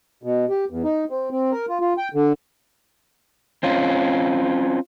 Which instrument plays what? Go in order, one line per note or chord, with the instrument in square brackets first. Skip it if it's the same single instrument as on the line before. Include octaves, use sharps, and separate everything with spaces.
[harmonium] B2
G4
E2
D#4
C4
C4
A#4
F4
F4
G5
D3
[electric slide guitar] C4 C#4 F4